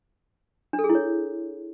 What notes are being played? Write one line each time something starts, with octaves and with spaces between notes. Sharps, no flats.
D4
A4
G#4
E4
C#5